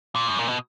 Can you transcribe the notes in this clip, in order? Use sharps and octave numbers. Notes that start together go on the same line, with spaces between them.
A#2
F#2
A#2
B2